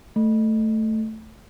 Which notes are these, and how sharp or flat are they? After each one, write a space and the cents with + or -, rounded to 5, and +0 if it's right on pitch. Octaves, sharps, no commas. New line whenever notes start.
A3 +0